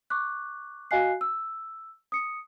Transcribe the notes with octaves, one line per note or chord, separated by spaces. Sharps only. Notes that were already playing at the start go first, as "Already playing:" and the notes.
C#6 D6 F#6
F#4 D#5 F5 G#5 F#6 C7
E6
D#6 C#7